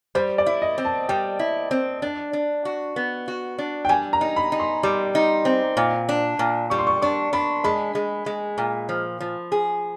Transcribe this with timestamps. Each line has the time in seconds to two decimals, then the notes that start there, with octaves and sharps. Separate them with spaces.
0.15 G3 C5
0.38 D5
0.46 E4
0.62 D#5
0.78 C4
0.85 A5
1.09 G3 G5
1.39 E4
1.71 C4
2.02 D4
2.33 D4
2.65 F#4
2.96 B3
3.28 F#4
3.58 D4
3.85 G5
3.89 G3 G#5
4.13 A#5
4.21 D#4
4.36 B5
4.52 D#4
4.60 C6
4.83 G3 D6
5.15 D#4
5.45 C4
5.77 A#2
6.09 D4
6.39 A#2
6.70 G3 C#6
6.79 C6
6.87 C#6
7.02 D4 C#6
7.33 D4 B5
7.64 G#3 B5
7.95 G#3
8.26 G#3
8.58 A#2
8.89 F3
9.20 F3
9.52 G#4